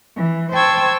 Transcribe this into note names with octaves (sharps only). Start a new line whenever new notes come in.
E3
C5 G5 A5 C#6 E6 G#6